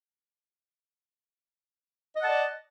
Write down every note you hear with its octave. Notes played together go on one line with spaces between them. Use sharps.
D5 D#5 F#5 A5